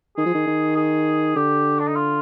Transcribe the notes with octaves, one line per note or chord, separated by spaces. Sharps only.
D#3 G#4
F3
D#3
D#3
G#4
D3 G4
D4
D#4
F4